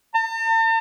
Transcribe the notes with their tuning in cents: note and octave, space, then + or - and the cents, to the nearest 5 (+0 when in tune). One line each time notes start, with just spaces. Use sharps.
A5 +45